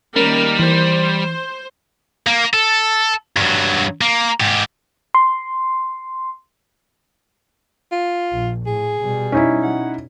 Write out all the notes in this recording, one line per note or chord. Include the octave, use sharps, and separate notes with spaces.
D#3 G3 A#3 C#4 A#4
E3 C5
A#3
A4
G2 F#3
A#3
G#2 G4
C6
F4
A#1
A2 G#4
B2 G3
C#4 D#4 E4
F#5